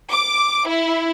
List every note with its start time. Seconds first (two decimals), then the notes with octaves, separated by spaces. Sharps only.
0.13 D6
0.68 E4